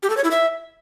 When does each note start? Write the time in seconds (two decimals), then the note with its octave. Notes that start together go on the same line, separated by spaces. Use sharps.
0.03 G4
0.10 A4
0.17 C#5
0.24 E4
0.31 E5